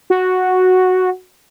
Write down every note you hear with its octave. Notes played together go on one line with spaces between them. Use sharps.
F#4